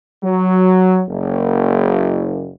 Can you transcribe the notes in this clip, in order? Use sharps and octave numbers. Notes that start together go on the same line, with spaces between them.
F#3
F#1